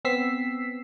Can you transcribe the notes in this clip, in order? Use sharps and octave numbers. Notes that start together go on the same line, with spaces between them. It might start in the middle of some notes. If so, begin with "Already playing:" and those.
B3 C4 E6 B6 C7